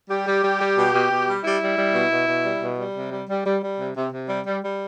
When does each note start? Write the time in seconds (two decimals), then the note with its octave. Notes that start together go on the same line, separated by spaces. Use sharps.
0.10 G3 G4
0.27 G3
0.44 G3
0.61 G3
0.78 B2
0.94 B2
1.11 B2
1.27 G3
1.44 G3 E4
1.61 G3
1.78 G3
1.94 B2
2.11 B2
2.28 B2
2.45 G3
2.61 B2
2.79 G3
2.95 C3
3.12 G3
3.29 G3
3.46 G3
3.62 G3
3.80 C3
3.96 C3
4.13 C3
4.29 G3
4.46 G3
4.63 G3